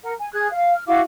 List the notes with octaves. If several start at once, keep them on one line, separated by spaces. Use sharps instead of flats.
A#4 F#5
G#5
G#4 F#6 G#6
F5
F6
E4 F#4 F5 D6